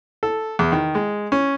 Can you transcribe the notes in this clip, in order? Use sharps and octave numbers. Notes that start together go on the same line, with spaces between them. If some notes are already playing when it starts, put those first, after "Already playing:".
A4
E2
D#3
G#3
C#4